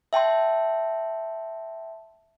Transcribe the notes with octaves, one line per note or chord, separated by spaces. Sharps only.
E5 G5 A5 C6